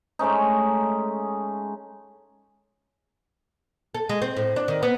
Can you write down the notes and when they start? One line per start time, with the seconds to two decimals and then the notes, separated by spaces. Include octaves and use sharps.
0.19 G#3 A3 C#4 D#4
3.94 A4
4.09 G#3
4.22 C4
4.37 A2
4.56 D4
4.68 D#3
4.83 B3